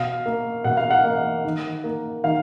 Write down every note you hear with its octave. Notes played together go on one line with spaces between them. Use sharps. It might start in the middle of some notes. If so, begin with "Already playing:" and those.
Already playing: B2 F5
A#3
B2 F#5
F5
F#5
A#3
D#3
A#3
D#3 F5